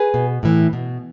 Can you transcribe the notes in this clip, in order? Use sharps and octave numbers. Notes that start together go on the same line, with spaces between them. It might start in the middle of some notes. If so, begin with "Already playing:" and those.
Already playing: G#4 B4
B2
A2 E3
B2